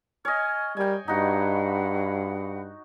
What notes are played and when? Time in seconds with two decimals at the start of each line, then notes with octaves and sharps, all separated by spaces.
0.25 C#5 D#5 G#5 F6
0.77 G3 A#4 G5 G#5
1.08 G2 D#4 F#4 F5 F#5 B5